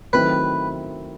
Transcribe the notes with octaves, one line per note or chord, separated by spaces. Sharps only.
D#3 F#3 A3 C4 E4 B4